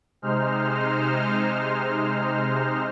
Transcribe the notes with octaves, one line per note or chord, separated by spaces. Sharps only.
C3 G#3 D#4 C5 F6